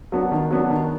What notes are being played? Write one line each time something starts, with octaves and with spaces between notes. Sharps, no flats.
F#3 B3 D4
D#3
F#3 B3 D4
D#3